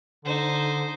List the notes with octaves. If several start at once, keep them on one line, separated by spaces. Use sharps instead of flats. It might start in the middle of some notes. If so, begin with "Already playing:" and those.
D3 D#4 C5